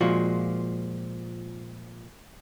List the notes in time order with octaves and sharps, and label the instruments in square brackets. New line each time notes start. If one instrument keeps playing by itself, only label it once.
[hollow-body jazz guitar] A#2 F3 G#3 F#4